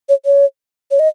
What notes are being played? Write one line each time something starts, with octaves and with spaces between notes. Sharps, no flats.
C#5
C#5
C#5
D#5